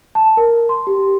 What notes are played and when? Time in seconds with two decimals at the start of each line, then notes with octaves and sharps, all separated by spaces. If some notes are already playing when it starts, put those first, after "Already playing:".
0.15 A5
0.37 A#4
0.69 C6
0.87 G4